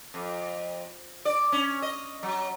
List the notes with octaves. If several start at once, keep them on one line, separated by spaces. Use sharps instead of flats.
F2
D5
C#4
D#5
F#3